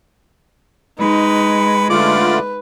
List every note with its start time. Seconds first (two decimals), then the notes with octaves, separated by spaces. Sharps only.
1.00 G#3 D#4 B4
1.90 D3 A3 F4 B4 D5